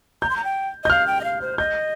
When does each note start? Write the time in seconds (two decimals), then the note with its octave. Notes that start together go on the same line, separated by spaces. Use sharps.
0.22 A#5 G6
0.30 C6
0.37 A#5
0.44 G5
0.84 D#5 G6
0.90 F5 F6
1.07 G5
1.21 D#5
1.24 F5
1.41 C5
1.58 D#5 G6